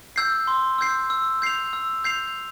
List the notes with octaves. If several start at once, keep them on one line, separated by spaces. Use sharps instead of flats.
E6 G6 C7
C6
E6 G6 C7
E6
G6 C7 F7
E6
G6 C7 F7